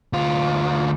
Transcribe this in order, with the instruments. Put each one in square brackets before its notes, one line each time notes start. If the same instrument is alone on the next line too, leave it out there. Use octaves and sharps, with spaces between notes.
[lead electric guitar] D2 F4